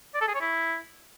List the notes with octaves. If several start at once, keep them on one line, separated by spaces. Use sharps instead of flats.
D5
A4
G#4
C#5
E4